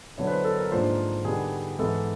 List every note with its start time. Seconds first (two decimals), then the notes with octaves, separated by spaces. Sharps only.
0.18 D3 F#3 B3 E4 C#5
0.27 B4
0.32 C5
0.44 A4
0.58 A#4
0.71 G#2 F3 A#3 D4 F4 C5
1.25 D3 G3 B3 D#4 G#4
1.79 G#2 E3 G#3 B3 E4 A4